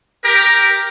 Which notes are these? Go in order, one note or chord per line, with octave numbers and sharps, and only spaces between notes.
G4 A#4